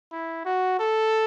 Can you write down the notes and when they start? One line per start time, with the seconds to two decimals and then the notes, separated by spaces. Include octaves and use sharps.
0.12 E4
0.45 F#4
0.79 A4